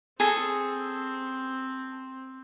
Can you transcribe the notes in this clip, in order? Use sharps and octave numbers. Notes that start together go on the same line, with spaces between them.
C4 G#4 A4